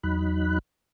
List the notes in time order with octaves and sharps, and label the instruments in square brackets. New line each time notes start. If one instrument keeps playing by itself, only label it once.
[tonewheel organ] E2 F#3 D#4 B5 F#6